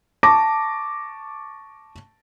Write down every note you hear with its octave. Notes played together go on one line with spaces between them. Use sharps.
A5 C#6 D6 A#6